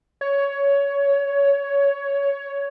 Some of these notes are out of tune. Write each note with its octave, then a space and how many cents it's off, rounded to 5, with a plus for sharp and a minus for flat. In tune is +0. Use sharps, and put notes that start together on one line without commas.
C#5 +15